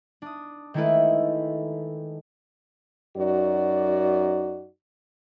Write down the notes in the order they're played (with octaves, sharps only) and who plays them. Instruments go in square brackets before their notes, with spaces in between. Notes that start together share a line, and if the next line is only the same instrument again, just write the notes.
[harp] D4 D#6
D#3 G#3 A3 E4 A4 B4
[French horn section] F#2 D#4 F#4 D5